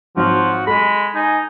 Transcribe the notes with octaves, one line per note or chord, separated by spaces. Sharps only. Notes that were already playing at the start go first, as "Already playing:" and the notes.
G#1 F3 F#3 F#4
G#3 A4 B5
D#4 G#5